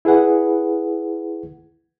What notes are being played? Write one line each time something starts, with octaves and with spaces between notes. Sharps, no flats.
E4 G#4 B4 F#5